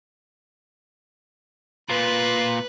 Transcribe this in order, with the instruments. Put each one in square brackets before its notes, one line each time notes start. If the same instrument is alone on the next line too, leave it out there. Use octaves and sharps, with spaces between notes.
[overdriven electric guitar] A#2 F4 [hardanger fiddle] B4